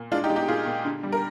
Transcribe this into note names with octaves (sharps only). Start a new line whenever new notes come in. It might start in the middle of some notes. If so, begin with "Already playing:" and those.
Already playing: A#2
G#3 D4 F4
D#4 G4
G#3
D#4 G4
A#2 F4 G#4
A#2
D3
G3
A#4